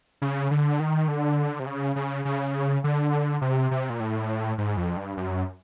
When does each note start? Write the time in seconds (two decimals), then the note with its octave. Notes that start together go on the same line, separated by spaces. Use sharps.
0.22 C#3
0.51 D3
0.80 D#3
1.08 D3
1.60 C3
1.67 C#3
1.96 C#3
2.25 C#3
2.84 D3
3.41 C3
3.71 C3
3.90 A#2
4.00 A2
4.58 G#2
4.77 F2
4.97 G2
5.17 F#2